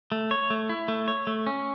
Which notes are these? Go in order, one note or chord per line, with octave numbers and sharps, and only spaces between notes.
A3
C#5
A3
E4
A3
C#5
A3
C#4